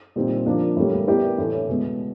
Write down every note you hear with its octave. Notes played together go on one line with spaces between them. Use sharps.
A#2 G3 C4 D#4
F3 A#3 D4
A2 E3 G3 A#3
B3 E4 G4 A#4 D5
A2 E3 A3 C#4 E4
B2 G#3 B3